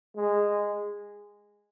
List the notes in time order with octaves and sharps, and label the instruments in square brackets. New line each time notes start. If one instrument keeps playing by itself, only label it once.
[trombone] G#3